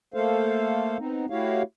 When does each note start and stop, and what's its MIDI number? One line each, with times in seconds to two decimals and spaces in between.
0.14 0.98 57
0.14 0.98 58
0.14 0.98 69
0.14 0.98 72
0.14 0.98 77
0.99 1.26 59
0.99 1.26 60
0.99 1.26 63
1.30 1.63 57
1.30 1.63 64
1.30 1.63 66
1.30 1.63 67
1.30 1.63 73
1.30 1.63 77